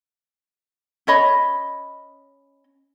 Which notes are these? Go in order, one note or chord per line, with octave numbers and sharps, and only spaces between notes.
C#4 C#5 D#5 B5